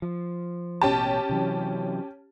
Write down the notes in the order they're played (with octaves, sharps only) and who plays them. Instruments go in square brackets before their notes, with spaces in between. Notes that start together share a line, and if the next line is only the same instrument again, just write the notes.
[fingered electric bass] F3
[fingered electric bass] A1 B2 [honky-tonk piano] C#4 G4 A5
[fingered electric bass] C3 E3 F#3